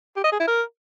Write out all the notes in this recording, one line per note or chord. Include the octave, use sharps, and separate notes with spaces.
G4
D#5
G#4
E4
A#4